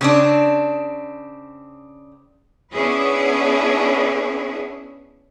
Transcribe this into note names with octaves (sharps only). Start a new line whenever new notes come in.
C#3 C4 D4
B3 C#4 D4 E4 G#4 B4